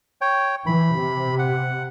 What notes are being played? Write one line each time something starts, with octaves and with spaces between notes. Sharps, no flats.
C#5 G5
E3 B5
C3
F#5